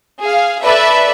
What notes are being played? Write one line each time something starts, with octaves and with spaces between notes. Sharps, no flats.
G#4 F5
A4 B4 D5 E5